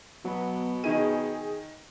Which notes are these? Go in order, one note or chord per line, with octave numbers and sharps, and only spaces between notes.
B2 F#3 B3
D#3 D#4 G#4 D#7